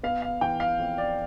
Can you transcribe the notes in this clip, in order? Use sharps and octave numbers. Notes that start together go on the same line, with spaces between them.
B3 F5
F5
E3 G5
F5
F2
D5